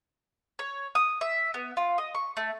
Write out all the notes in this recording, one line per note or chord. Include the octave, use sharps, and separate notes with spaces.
C#5
D#6
E5
B3
F4
D#5
C#6
A3